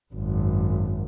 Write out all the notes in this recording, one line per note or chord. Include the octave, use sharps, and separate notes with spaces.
G#1 F#2